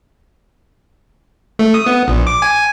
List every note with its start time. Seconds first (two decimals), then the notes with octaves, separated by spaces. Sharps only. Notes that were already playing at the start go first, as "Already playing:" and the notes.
1.59 A3
1.74 D#6
1.86 B3
2.08 A#1
2.27 D6
2.42 G#5